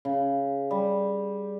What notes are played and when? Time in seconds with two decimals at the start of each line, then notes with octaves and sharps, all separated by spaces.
0.05 C#3
0.71 G3